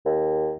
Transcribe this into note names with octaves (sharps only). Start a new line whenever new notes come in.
D#2